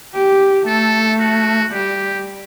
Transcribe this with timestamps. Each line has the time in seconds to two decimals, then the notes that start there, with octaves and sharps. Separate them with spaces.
0.15 G4
0.67 A3 A4
1.20 F#4
1.73 G3 G4